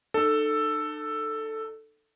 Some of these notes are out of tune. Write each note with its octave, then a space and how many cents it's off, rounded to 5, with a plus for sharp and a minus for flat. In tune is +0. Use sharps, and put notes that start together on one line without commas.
D#4 -45 A4 +5